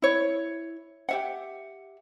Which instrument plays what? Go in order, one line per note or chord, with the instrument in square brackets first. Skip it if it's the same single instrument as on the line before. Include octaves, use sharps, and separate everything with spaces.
[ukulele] E4 C#5
G4 E5 F#5